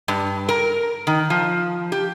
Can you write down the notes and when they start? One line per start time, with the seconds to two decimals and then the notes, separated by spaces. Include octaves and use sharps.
0.08 G2
0.49 A#4
1.07 D#3
1.30 F3
1.92 G4